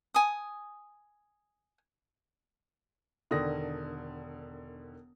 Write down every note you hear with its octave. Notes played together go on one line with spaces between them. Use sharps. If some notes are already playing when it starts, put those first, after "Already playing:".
G#5 D#6
E1 D3 D#3 D#6 A#6